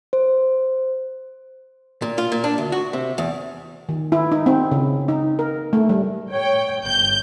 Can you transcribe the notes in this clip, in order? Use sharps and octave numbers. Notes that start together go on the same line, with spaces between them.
C5
A#2
F4
A#2
D4
D2
F#4
C3
E2
D#3
E4
D#4
C4
C#3
D#4
A#4
A3
G3
C#5 G5
G1 G6